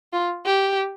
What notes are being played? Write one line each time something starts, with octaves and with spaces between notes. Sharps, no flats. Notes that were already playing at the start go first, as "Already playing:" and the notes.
F4
G4